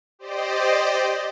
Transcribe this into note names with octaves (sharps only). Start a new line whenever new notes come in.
G4 C5 D5 D#5